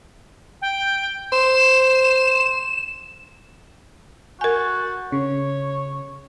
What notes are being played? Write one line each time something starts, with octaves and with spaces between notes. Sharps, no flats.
G5
C5 E7
F#4 A#4 G#5 G6 A6
C#3 C#5